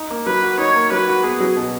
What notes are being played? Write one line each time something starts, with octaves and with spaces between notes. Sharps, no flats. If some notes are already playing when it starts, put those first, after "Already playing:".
Already playing: D#4
A#3
F#3 B4
F#4
D#4 C#5
A#3
F#3 B4
F#4
B3 G#4
F#3
B2